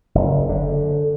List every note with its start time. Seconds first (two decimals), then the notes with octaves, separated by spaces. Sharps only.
0.15 F#1
0.49 D3